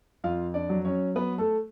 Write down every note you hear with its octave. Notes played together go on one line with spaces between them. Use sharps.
F2 F4 F5
D4 D5
F#3
C#4 C#5
B3 B4
A3 A4